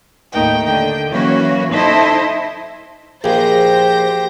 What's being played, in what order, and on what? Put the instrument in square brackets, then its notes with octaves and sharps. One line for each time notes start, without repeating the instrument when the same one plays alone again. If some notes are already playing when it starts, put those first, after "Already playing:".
[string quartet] D#2 A2 A3 D#4 A#4 G5
D3 G5
E3 F#3 A#3 C#4 F#4 C#5
D#4 E4 A4 C5 D#5 E5
[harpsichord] A#1 [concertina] G4 [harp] G#4 [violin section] C5 G6 A#6